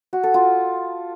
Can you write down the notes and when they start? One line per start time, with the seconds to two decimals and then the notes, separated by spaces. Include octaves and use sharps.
0.13 F#4
0.23 A4
0.34 F4